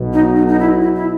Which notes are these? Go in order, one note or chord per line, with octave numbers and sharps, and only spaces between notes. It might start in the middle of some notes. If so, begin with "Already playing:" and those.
Already playing: B1 B2
D#4
D#4
D#4
E4
E4
E4